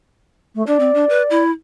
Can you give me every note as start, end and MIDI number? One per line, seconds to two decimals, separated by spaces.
0.55 0.65 57
0.67 0.78 62
0.67 1.42 74
0.80 0.93 60
0.94 1.05 62
1.09 1.23 71
1.30 1.51 64